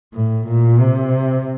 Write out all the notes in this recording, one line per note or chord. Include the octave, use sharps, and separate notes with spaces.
A2
A#2
C3